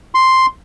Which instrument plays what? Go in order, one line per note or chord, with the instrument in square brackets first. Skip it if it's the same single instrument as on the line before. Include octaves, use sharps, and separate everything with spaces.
[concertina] C6